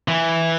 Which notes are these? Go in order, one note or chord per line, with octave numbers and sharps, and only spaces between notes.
E3